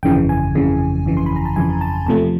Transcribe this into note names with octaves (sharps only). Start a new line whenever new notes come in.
G1 F2 C#3 E3 G5
G#5
G1 F2 C#3 E3
G1 F2 C#3 E3
C6
B5
A#5
A5
G1 F2 C#3 E3 G#5
A5
E2 C3 F3 A3 A5